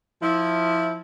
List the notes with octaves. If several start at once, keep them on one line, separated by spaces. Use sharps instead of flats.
F3 E4